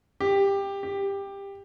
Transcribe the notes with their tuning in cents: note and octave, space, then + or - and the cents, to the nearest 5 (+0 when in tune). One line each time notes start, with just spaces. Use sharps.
G4 +15
G4 +15